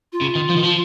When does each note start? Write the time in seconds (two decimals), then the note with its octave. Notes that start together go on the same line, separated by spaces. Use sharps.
0.12 F4
0.21 C#3
0.35 D#3
0.50 F3
0.57 D#3
0.64 F3